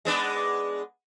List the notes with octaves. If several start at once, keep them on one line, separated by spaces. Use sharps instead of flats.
G#3 B3 D4